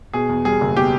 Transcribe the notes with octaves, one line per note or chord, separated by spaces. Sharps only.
B2 G#4
E2
G3 G#4
F#1
B2 G4